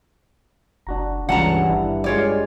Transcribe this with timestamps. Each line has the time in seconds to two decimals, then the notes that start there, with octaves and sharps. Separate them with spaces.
0.87 F#1 D4 F#4 A#5
1.29 C#2 G2 E3 C#4 D5 F#5 A5 A#5
1.69 G#1 D4 E4
2.04 G3 G#3 F4 C#5 D5